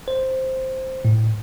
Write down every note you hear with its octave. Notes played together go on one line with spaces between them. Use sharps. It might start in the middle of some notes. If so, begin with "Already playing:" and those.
C5
A2